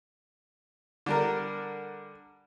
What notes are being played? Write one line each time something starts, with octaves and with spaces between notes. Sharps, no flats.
D3 G3 A#4